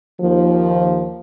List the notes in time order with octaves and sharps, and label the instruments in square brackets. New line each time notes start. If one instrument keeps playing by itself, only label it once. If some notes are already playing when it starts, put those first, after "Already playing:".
[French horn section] D#2 F3